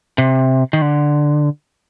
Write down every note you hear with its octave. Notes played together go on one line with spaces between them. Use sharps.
C3
D#3
D3